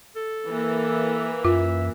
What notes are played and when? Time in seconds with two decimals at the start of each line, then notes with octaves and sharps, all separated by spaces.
0.16 A4
0.47 E3 A#3
1.45 F#2 F4 E5